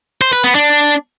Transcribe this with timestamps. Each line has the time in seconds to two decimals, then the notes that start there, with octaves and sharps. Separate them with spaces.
0.22 C5
0.33 B4
0.44 B3
0.55 D4